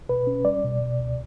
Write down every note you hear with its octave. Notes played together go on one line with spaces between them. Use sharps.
B2 B4
C#4
G3 D5
B2
B2
C#2